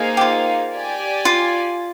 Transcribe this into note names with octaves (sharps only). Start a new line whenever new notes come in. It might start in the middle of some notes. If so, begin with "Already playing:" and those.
Already playing: A#3 D#4 G#4 C5 F5
G4
F4
G4 D5 G#5
F4